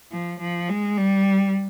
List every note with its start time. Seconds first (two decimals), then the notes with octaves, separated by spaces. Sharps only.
0.12 F3
0.40 F3
0.69 G#3
0.98 G3